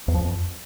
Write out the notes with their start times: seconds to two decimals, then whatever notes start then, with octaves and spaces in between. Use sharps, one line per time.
0.08 E2
0.14 F3
0.21 F2